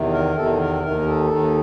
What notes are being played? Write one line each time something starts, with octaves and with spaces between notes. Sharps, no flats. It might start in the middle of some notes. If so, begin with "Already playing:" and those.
Already playing: E2 C3 D#3
A#4
E2 C3 D#3 A4
A#4
D#2 D#3 A#4
A4
D#2 D#3